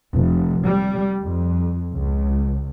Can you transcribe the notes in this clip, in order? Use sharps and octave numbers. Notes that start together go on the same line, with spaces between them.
F1
G3
F2
C#2